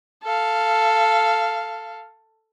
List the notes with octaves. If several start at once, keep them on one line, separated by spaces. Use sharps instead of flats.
A4 F5